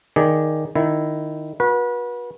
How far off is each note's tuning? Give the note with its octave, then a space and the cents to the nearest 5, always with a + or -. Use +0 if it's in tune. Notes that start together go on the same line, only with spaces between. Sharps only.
D#3 +0 G#4 +0 D5 +0
D#3 -15 E4 +0
F#4 -25 B4 -30